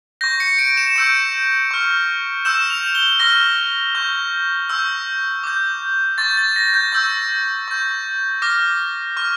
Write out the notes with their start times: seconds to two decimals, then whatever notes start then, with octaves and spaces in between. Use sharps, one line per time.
0.21 C#6 G6 A#6
0.40 C#7
0.58 D7
0.77 E7
0.96 C#6 E6 G6 D7
1.71 C#6 F6
2.45 C#6 E6 G6 E7
2.70 F7
2.95 G7
3.19 C#6 F6 A#6
3.95 C#6 G6
4.69 C#6 E6 G6
5.44 D6 G6
6.18 C#6 G6 A6
6.37 A6
6.56 A#6
6.74 G6
6.92 C#6 E6 G6 A6
7.68 C#6 G6
8.42 D6 F6 A#6
9.17 C#6 F6